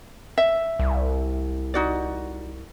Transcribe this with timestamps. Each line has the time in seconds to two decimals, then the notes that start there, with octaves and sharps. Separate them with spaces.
0.38 E5
0.79 C2
1.74 D#4 F#4 D5